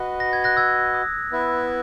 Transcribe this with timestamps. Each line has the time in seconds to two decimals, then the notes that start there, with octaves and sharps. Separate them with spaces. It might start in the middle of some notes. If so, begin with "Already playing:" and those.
Already playing: F#4 B4 D#5
0.20 A#6
0.33 G#6
0.44 F#6 A#6
0.57 E6 G#6
0.94 D#6
1.31 B3 E4 B4 E5